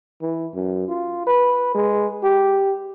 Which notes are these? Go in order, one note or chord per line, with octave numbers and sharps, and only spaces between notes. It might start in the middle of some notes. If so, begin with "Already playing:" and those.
E3
F#2
F4
B4
G#3
G4